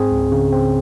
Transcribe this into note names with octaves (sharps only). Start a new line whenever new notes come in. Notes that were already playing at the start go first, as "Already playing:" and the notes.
Already playing: G#2 C4 G#4
C#2
C#3
C4